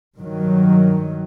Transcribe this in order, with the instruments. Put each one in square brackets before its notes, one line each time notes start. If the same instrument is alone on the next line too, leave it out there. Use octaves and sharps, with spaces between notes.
[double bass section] G2 D#3 F#3